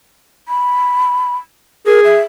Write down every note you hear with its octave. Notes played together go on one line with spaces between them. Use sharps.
B5
G#4 A#4
E5